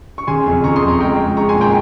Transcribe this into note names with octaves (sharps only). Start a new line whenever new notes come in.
C#6
C#3 G#5 C6
F2
C#3 A#5 C#6
C6 D#6
F2
A#5 C#6
G#3 G5 A#5
G#3
G#3 A#5 C#6
G#5 C6
A#2
G5 A#5